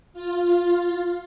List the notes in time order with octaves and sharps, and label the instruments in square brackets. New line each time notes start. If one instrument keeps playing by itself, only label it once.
[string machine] F4